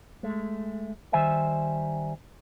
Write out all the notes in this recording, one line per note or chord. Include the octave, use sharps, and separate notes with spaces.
G#3 A3
D#3 G3 C5 E5 G#5